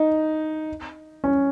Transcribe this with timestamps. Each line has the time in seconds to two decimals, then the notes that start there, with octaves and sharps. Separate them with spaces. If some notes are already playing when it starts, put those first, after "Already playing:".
Already playing: D#4
1.24 C#4